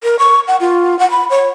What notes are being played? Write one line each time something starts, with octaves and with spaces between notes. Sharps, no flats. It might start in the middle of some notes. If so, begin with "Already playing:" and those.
A#4
C#6
F#5
F4
F#5
B5
C#5